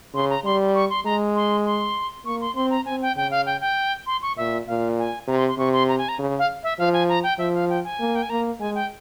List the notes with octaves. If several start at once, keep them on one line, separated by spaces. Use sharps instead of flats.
C#3 C6
A#5
G3 C6
C#6
C6
G#3 A#5
C6
C6
A#3 C#6
C6
C4 C6
A#5
C4 G#5
G5
C#3 G5
F5
G5
G5
C6
C#6
A#2 E5
A#2 F5
G#5
C3 A#5
C6
C6
C3 C#6
C6
A#5
G#5
A#5
C#3
F5
E5
F3 F5
G#5
A#5
G5
F3 E5
F5
G5
G#5
A#3
G5
G#5
A#3 A#5
G#3 G#5
G5